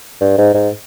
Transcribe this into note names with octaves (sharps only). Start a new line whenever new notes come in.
G2
G#2
G#2